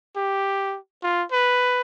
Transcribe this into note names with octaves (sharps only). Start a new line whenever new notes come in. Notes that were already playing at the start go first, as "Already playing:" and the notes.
G4
F4
B4